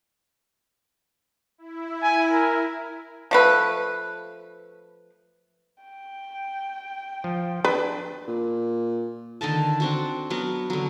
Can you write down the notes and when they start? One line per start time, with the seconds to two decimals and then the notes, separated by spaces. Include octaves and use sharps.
1.58 E4
2.03 G#5
2.32 A#4
3.31 F3 A3 B4
5.83 G5
7.24 F3
7.64 D4 B4
8.28 A#2
9.41 D3 D#3 D#5 A5
9.80 C4 D4 F#4
10.30 F#3 B3 A#4
10.70 D3 F#3